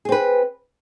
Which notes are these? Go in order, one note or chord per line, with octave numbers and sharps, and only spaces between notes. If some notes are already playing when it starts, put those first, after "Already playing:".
C4 G#4 B4